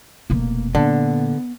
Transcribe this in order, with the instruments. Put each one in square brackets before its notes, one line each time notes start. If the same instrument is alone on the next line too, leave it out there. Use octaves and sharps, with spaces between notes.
[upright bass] F1 B2 [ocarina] A#3
[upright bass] A#2 [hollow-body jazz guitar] D3 [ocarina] B3